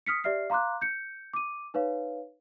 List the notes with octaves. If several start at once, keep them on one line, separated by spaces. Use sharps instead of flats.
D#6 F6 B6 C#7
G4 D5 E5 F6 C7
F5 A#5 C6 D6 F#6
G6 C#7
D6 D#7
D#4 B4 C#5 F5